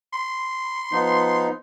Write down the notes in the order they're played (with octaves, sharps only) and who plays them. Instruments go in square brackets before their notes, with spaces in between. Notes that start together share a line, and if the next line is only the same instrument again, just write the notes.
[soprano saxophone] C6
[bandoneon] F3 B3 D#4